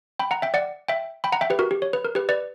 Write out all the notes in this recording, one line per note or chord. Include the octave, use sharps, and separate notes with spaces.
G5 B5
F#5 A#5
E5 G5
D5 F#5
E5 G5
G5 B5
F#5 A#5
E5 G5
G4 B4
F#4 A#4
G4
C#5
B4
A#4
G4 B4
B4 D5